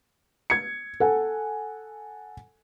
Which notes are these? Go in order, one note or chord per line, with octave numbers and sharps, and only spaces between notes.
G#6 C#7
A4 F#5 G#5